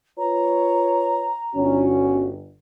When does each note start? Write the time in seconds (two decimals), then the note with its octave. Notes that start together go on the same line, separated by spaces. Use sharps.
0.18 F4 B4 C#5 A#5
1.55 G1 C#4 F#4